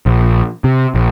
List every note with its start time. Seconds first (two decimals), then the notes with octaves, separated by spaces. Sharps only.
0.06 A#1
0.64 C3
0.95 A#1